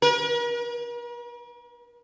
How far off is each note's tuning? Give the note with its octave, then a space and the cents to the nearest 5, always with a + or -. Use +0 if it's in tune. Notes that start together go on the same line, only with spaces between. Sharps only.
A#4 +45